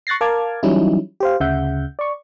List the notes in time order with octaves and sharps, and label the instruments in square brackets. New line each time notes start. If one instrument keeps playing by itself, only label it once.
[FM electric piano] C#6 F#6 A6 A#6 C7
A#4 F5 A5 D6 F6 G#6
E3 F#3 G3 C#4 D#4 E4
G4 C5 F5
D2 C#3 E5 F#5 G6
D5 C#6